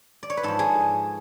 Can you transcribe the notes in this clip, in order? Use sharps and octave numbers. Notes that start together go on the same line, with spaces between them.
D5
C#5
B4
G#2 F3 A4
G#4